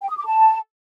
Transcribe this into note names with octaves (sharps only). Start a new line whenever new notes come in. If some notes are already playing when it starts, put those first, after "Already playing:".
G5
D#6
D6
A5